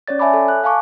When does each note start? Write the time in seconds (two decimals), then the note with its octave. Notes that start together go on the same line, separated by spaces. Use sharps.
0.08 C#4 C#5 D5 A6
0.19 C#5 E5 G#5 A5 B5 D6
0.34 A4
0.48 F#6
0.64 F5 G#5 A5 C#6 D6